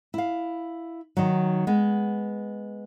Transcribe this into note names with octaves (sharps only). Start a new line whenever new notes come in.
E4 F5
D#3 F#3
G#3 B3